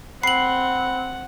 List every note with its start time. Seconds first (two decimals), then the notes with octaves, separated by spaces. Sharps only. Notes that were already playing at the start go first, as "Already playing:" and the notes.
0.23 C4 F#5 B5 C7 F#7